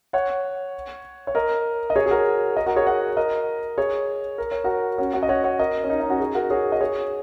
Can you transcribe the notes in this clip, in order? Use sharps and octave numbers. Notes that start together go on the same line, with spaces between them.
C#5 F#5
C#5
A#4 D#5
D#5
G#4 C#5
G#4
F#4 A#4
A#4 D#5
F#4 A#4
G#4 C#5
C#5 F#5
A#4 D#5
G#4 C#5
A#4
C#5
F#4 A#4
C#4 F#4
C#4 F#4
D#5
C#5 F#5
C#5 F#5
A#4 D#5
C#4
D#4
D#4
C#4 F#4
D#4 G#4
F#4 A#4
G#4 C#5
D#5
G#4 C#5